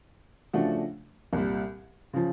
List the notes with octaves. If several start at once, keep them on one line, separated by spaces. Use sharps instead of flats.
C#3 F3 A3 D4 F#4
C2 A#2 G3
C#3 F3